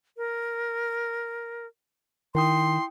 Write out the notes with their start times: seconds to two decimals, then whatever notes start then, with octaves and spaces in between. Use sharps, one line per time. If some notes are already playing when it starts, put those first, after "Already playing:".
0.17 A#4
2.35 D#3 E4 G5 C6 D#6